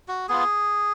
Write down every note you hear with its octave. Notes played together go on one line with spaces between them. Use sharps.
F#4
B3 F4 G#4